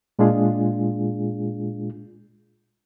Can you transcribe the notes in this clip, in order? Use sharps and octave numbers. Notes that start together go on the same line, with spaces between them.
A#2 G#3 D4 F4 G#4